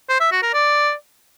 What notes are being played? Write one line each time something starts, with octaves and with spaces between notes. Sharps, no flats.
C5
E5
F#4
A#4
D5